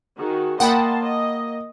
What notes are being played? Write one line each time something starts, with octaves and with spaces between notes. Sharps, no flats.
D#3 F#4 G#4
A#3 D#5 F#5 G5 A5 B5 C6
D#5